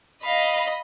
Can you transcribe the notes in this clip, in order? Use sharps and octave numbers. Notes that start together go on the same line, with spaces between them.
D#5 F5 B5